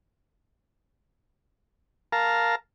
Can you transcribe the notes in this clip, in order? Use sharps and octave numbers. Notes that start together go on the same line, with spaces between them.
A#4 F5 A5 A#5